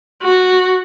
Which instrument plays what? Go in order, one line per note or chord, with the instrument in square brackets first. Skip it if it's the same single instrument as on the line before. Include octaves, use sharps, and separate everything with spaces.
[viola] F#4